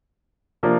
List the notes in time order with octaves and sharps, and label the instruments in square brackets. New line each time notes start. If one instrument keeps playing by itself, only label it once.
[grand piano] C3 F3 A#3 D4